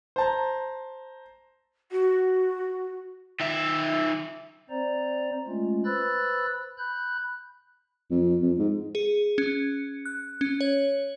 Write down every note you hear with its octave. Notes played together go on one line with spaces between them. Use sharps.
C5 A5 A#5
F#4
D#3 E5
C4 C5 D5 A#5
G#3 A3 C#4 F4
B4 C5 B5 E6 F#6 A6
B5 F#6 G6
F2
F2
G#2
G#4
C#4
F#6
C#4
C#5